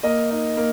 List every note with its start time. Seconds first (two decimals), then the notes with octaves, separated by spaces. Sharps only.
0.03 A#3 D#5
0.31 D#4
0.57 A#3